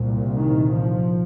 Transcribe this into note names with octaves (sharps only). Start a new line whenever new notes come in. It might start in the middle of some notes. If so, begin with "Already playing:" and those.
Already playing: C2 A#2
D#3
F3